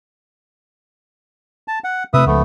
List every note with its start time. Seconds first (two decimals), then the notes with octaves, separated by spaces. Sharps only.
1.68 A5
1.84 F#5
2.14 C3 A3 B4 E5 D#6
2.26 C#2 F3 A3 B3